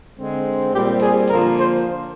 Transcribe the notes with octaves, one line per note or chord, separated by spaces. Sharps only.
D3 G#3 C4
A#2 G3 C4 G4
G#4
D3 F3 A#3 A#4
C5